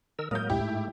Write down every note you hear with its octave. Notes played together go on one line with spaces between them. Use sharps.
D#3 A#4 E6
A2 F#3 G#3 A#3 A#4 D#6 G6
D2 G2 C3 E4 G4 G5
G#2 A3